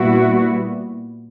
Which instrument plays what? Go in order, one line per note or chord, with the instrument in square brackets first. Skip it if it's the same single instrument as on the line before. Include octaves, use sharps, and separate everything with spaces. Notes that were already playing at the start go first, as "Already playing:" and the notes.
Already playing: [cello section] A#2 G3 B3 E4 F#4